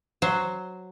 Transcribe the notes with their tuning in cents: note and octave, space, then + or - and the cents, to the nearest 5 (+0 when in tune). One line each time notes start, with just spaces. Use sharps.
F#3 +0 C5 +0